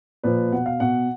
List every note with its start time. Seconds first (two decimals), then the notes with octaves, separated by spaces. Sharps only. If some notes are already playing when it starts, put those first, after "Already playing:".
0.24 A#2 F3 B4
0.52 B2 F#5
0.66 F5
0.80 B2 F#5